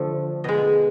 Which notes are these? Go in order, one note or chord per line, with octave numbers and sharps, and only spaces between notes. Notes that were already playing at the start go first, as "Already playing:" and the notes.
Already playing: D3 F3 A3
B2 G#3 D#5